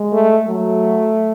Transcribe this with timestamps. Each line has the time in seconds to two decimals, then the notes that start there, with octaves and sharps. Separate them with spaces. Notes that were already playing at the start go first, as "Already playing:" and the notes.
Already playing: G#3
0.13 A3
0.47 F#3 A3